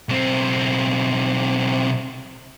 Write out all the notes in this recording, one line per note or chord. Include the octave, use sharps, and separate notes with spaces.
B1 C4